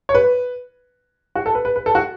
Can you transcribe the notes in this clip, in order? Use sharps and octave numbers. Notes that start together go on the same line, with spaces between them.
C#5
B4
F#4
A4
B4
B4
B4
A4
F#4